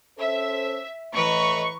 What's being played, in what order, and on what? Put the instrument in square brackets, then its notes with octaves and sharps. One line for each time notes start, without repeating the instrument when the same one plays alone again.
[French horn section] C#4 A4 C5 [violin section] E5
[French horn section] A2 D#5 [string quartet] E3 B4 A#5 [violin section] C#6